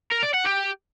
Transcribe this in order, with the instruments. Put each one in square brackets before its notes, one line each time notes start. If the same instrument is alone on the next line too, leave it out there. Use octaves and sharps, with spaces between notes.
[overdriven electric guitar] A#4
D5
F#5
G4